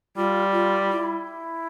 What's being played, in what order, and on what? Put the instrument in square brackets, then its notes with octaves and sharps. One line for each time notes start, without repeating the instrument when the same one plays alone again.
[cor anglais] G3 [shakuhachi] F4
[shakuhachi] F4
E4